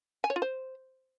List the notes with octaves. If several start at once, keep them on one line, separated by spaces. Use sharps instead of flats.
G#5
C#5
F4
C5